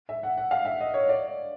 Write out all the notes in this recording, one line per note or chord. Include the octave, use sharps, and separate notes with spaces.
E5
F#5
F#5
F5
E5
D#5
C#5
D5